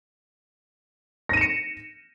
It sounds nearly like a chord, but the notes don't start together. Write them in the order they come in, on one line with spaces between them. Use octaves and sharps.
A#6 D#7 E7 C#7